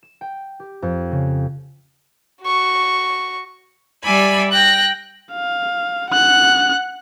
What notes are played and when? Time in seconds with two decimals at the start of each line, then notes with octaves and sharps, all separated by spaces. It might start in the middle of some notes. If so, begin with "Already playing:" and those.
0.03 E7
0.21 G5
0.60 G4
0.82 F2
1.11 C#3
2.43 F#4 C#6
4.03 G3 D5 E5 G#5 B5
4.50 G5 F#6 A#6
5.33 F5
6.10 F#5 F#6